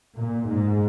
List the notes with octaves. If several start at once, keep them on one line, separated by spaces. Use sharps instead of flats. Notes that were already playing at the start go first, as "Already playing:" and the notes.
A#2
G#2